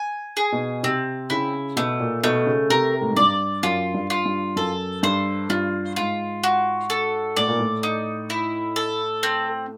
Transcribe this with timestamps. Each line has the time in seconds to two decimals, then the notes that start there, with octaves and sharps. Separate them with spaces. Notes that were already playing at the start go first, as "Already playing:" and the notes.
Already playing: G#5
0.37 G#4
0.53 B2
0.83 C3 C4
1.30 C#3 E4
1.76 B2 A3
2.00 A#2
2.24 B2 A3
2.46 C#3
2.70 C3 A#4
3.01 A2
3.09 G#2
3.16 G2 D5
3.63 F#2 F4
3.94 G2
4.10 F4
4.26 G2
4.56 F#2 A4
5.03 G2 C5
5.50 G2 F4
5.96 G#2 F4
6.44 F#4
6.90 A4
7.36 A2 D5
7.48 A#2
7.59 A2
7.83 D#4
8.30 E4
8.76 A4
9.23 C4